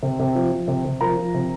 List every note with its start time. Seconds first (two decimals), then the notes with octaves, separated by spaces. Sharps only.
0.03 C3
0.19 C3
0.35 F3
0.52 F3
0.68 C3
0.85 C3
1.01 F3 A#4 A#5
1.17 F3
1.34 C3